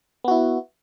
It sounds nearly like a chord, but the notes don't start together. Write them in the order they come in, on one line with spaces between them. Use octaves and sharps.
B3 F#4 E4